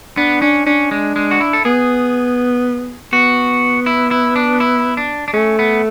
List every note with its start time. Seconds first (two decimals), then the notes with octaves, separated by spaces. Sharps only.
0.17 B3 D4
0.42 C#4 D4
0.66 C#4 D4
0.91 G#3 D4
1.16 G#3
1.31 F#4
1.40 E4
1.53 A4
1.65 B3 G#4
3.13 B3 F#4
3.86 E4
4.11 E4
4.36 D4
4.60 E4
4.97 D4
5.28 D4
5.34 A3 C#4
5.59 B3